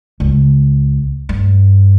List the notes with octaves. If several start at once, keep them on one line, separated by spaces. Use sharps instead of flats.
C#2
G2